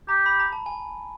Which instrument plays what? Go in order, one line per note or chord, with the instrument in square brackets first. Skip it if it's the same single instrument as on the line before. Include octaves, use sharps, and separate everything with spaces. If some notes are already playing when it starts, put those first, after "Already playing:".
[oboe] G4 [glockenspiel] A#5
[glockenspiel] B5
A#5
A5
G#5